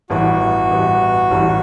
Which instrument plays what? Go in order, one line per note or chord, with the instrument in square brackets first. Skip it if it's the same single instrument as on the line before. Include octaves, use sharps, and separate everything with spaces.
[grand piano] A1 G2 E3 B3 [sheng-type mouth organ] F#4
[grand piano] A1 G2 E3 B3
A1 G2 E3 B3